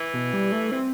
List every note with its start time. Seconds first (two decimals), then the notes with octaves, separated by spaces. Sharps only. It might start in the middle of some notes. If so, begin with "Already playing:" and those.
Already playing: E3
0.14 B2
0.33 G3
0.52 A3
0.72 E3 C4